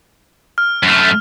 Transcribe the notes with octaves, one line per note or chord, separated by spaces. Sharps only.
F6
F#2 A3